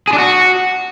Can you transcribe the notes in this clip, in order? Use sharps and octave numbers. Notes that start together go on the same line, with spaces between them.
G#4
D4
F#4